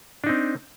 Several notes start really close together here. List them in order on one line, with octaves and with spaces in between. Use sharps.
D4 D#4 C4